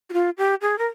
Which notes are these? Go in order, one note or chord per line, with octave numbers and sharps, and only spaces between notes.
F#4
F4
G4
G#4
A#4